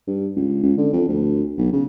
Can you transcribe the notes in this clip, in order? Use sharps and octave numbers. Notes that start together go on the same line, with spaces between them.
G2
C#2
C#2
D3
F2
D2
B1
C#3